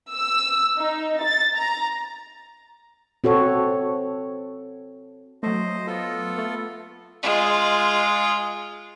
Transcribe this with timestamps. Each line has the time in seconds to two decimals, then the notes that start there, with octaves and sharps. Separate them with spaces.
0.11 E6
0.77 D#4
1.21 A6
1.55 A#5
3.24 C4 F#4 A4 C#5
5.43 F#3 A3 C5 D#5
5.87 B3 F4 A4
6.38 A3
7.23 G#3 F4